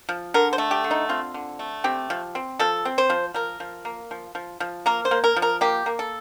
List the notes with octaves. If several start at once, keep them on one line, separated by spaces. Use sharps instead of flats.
F3
D3 A#4
C5
A3
G4
D3
D#4
C4 F4
D3
A3
C4 G4
F3
C4
F3 A4
C4
C5
F3
F3 A#4
F3
A#3
F3
F3
F3
A#3 A#4
C5
A#3
A#4
F3
A#4
A#3 G4
A#3
A4